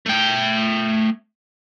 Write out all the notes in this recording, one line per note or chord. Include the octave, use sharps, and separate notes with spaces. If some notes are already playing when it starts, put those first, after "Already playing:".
A3 G5